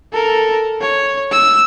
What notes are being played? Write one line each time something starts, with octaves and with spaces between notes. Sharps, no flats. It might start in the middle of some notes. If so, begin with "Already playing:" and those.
A4 A#4
C#5
E6